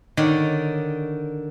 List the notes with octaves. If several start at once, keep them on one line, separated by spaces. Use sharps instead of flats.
D3 D#3 D#4 C#5 D5